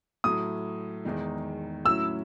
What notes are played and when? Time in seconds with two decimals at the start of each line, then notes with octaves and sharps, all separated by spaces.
0.24 A2 F#3 A3 D#6
1.05 E2 D#3 G#3 D#4
1.85 A2 F#3 C#4 E4 E6